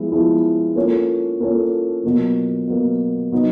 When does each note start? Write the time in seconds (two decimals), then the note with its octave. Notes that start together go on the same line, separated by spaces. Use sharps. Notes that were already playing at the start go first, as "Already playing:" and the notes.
Already playing: F3 G#3 B3 E4
0.12 F3 G#3 B3 E4
0.76 A#3 C#4 F4 A4 C#5
1.40 A#3 C#4 F4 A4 C#5
2.04 B2 F#3 A#3
2.68 B2 F#3 A#3
3.32 F#3 B3 D#4